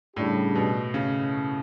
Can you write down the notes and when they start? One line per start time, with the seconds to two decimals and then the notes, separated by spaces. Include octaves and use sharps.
0.16 A2 C#3 G3 D4 G4
0.55 B2
0.94 C#3